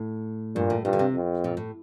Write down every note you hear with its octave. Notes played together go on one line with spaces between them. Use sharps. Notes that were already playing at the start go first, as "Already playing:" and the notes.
Already playing: A2
G2 A#2
A2
G2 A#2
D3
C3
F2
A#2
A2